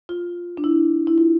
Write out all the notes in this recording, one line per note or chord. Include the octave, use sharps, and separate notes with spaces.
F4
D4
E4
E4
F4